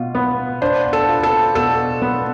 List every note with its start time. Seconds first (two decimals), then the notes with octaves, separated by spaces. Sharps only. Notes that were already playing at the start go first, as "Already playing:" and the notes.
Already playing: B2 F4
0.15 B3
0.61 D4 C5
0.93 A4
1.08 F4
1.23 A4
1.55 B2 A4
2.02 B3